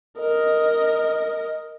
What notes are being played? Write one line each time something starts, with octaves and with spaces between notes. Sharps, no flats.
A#4 D#5